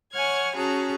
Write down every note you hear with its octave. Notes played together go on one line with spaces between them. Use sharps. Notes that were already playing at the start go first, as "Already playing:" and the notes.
C#5 F#5 G#5 F6 G#6
C#4 F#4 G#4 A5 A#5